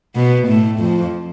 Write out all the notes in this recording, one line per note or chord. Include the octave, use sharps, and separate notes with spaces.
B2 B3
A2 A3
F2 F3